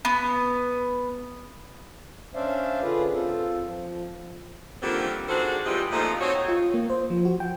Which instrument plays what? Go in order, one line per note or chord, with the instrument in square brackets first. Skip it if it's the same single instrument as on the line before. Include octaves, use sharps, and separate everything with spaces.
[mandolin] B3
[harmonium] C#4 D4 C5 D5 E5 F5
D3 F4 G#4 B4
C4 F4 A4
F3
[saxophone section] D3 D#3 F3 G3 A#3 C4
D#3 D4 F#4 G#4 A4 C5
C3 E3 G3 F4 G4 D#5
A#2 F3 A3 D#4 C5 D#5
C4 D#4 F#4 C#5
[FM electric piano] F4
A#3
C5
F3
F#4
G5